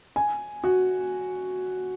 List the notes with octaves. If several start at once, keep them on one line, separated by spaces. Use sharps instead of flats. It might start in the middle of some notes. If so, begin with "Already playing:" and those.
G#5
F#4